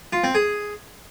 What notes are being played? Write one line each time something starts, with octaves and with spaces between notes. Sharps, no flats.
F4
C4
G#4